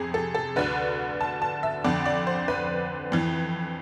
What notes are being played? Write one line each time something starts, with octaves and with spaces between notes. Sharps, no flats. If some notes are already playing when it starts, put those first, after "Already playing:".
Already playing: F2 C3 G#4
A4
A4
D2 D3 B4
A5
A5
E5
F2 D3 D5
D5
C5
B4
F2 E3